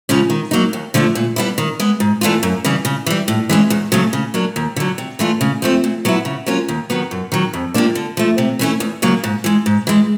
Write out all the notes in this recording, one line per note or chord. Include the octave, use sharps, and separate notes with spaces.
C#3 F3 G#3 C#4
D#3
F#3 A#3 D#4
D#2
D3 F3 A3 D4
A#2
G3 B3 E4
D#3
G#3 B3
G#2
E3 A3 D4 F4
F#2
C#3 E3 G3
C#3
E3 G3
A2
E3 G#3 C#4
E2
C#3 F#3 A3
C#3
F#3 A#3 D4
D#2
D3 F#3
C3
E3 A3 D4 F4
C#3
F3 A3 C4
A#2
F#3 B3 E4
C#3
F#3 A#3 C#4 F4
D#2
D#3 F#3 B3
F#2
D#3 F#3
F2
C3 F3 A#3 D4
D3
F3 A3
C3
E3 A3 C#4 E4
E2
C#3 F#3 A#3
G#2
E3 G#3
G#2
E3 G#3